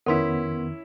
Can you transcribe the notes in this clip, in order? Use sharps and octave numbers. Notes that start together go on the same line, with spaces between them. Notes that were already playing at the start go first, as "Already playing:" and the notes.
F2 D#3 B3 C#4 E4 A#4 C6 B6